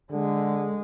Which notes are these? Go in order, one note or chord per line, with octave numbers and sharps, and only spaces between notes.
D3 G#3